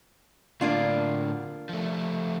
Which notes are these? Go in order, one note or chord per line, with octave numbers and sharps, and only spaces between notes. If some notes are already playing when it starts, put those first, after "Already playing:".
A2 D3 A#3 D4 F4
F3 A3